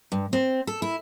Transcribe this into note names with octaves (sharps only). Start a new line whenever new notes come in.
G2
C4
A4
E4